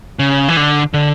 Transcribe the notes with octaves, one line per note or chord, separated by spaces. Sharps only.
C#3
E3
D3
D3